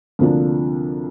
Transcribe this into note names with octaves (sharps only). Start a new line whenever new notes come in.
D2 C3 F3 A#3 D4